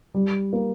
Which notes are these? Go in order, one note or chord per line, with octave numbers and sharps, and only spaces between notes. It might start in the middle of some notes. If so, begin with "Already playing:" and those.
G3
A#3